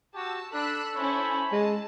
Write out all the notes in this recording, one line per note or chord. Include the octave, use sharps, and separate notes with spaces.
F#4 G4 A5 E6
D4 A4 B5 E6 F#6
C#4 E4 C5 C#5 B5
G#3 A5